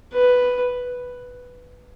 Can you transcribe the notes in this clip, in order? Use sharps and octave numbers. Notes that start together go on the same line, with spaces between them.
B4